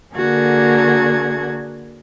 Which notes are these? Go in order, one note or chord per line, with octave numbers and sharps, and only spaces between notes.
D3 A#3 F#4 G#4 G#6